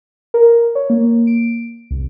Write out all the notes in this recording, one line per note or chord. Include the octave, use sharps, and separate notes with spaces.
A#4
C#5
A#3
D7
C2